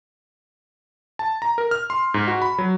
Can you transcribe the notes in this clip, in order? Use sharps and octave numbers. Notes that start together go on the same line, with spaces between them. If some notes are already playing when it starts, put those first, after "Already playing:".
A5
A#5
A#4
F6
C6
G#2
F#4
B5
F#3